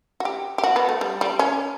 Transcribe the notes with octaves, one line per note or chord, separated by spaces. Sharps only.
F#4
G4
G4
F#4
B3
A3
G3
G3
C#4